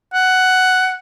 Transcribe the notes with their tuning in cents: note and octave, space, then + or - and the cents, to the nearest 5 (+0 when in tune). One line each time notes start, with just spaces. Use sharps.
F#5 +5